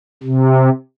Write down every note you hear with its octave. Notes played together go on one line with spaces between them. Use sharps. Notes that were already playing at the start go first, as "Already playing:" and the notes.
C3